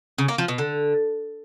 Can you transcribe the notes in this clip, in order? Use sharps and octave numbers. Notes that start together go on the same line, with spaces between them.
C#3
A#3
F3
B2
D3